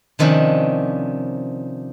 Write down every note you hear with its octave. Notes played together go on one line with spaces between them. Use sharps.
C3 D#3 F3 C#4 D4